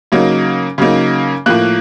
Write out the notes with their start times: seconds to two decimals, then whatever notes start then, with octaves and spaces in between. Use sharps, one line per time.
0.12 C#3 F#3 A#3 D#4
0.78 C#3 F#3 A#3 D#4
1.46 A2 F3 A#3 F#6